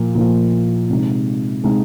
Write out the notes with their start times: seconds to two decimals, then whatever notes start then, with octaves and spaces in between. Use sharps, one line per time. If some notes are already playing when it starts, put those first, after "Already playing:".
Already playing: A#2 F3 A#3 F4
0.15 A#2 F3 A#3 F4
0.90 C3 G#3 D#4
1.64 C3 G#3 D#4